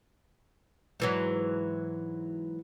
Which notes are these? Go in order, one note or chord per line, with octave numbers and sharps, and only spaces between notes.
G#2 E3 F#3